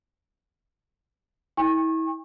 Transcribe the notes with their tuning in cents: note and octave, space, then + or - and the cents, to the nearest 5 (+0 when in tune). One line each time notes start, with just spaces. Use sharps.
E4 -35 G5 +45 C#6 -30